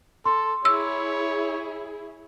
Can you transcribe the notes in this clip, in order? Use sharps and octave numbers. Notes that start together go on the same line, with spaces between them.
A4 C6
E4 G#4 C#5 E6